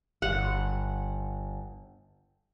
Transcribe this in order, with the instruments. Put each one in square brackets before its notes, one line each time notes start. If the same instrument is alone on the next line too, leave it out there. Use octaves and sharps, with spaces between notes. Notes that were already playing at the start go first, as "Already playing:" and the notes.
[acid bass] G1 [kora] F#5